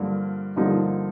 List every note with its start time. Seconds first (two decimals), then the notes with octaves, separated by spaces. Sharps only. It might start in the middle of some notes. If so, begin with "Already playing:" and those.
Already playing: G2 D3 F3 A#3
0.56 G2 D3 F3 A#3 D#4